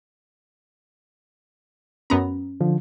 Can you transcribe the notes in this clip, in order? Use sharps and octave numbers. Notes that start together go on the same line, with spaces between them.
F#2 B3 C#4 A#5
D3 F3